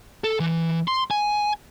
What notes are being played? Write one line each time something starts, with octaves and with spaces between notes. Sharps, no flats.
A4
E3
C6
G#5